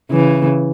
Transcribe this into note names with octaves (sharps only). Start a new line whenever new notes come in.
C#3 E3